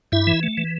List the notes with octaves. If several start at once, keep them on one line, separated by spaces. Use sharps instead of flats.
G2 E4 E5
E3
A3
E3